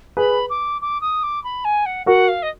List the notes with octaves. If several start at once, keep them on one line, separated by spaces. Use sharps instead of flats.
G#4 B4 B5
D6
D6
D#6
D6
B5
G#5
F#5
F#4 A#4 F#5
F5
D#5